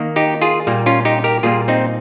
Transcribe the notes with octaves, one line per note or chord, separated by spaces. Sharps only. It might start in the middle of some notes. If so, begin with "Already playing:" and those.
Already playing: D#3 A#3
D#4 G4
F4 G#4
A#2 G3 A#3
C#4 F4
D#4 G4
G4 A#4
A#2 G3 A#3 F4 G#4
C4 D#4